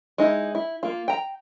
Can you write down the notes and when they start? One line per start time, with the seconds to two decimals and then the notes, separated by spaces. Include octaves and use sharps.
0.18 G#3 D#4 E4
0.55 E4
0.83 A#3 F4
1.08 G5 A#5